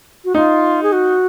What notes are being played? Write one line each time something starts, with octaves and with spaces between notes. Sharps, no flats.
F#4
D#4 F4
G#4
F#4